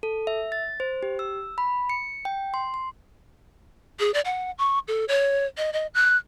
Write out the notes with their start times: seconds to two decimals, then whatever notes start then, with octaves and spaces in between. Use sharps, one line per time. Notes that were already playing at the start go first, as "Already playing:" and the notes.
0.03 A4
0.27 E5
0.52 A6
0.80 C5
1.03 G4
1.19 E6
1.58 B5
1.90 C#7
2.25 G5
2.54 C6
2.74 C6
3.99 G#4
4.14 D5
4.25 F#5
4.58 C#6
4.88 A4
5.08 C#5
5.57 D#5
5.73 D#5
5.94 F#6